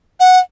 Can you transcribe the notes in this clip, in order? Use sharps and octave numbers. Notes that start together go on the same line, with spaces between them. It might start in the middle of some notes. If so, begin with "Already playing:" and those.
F#5